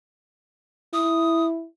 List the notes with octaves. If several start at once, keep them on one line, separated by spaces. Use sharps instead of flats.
E4 D#6